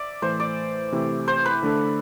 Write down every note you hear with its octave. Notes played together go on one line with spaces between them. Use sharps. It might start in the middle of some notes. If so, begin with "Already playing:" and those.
Already playing: D5 E5
A2 E3 A3 C5
D5
C3 E3 A3 E4 G4
C5
B4
D3 A3 D4 A4